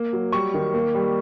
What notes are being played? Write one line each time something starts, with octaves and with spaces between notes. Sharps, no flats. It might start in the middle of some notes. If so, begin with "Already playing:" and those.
Already playing: A#3
F#3
G3 C#6
D#3
A#3
G3